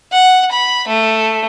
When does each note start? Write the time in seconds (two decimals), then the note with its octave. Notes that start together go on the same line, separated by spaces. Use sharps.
0.12 F#5
0.52 B5
0.88 A3